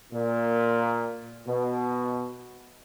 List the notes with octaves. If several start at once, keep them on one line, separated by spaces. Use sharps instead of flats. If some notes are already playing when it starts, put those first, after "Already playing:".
A#2
B2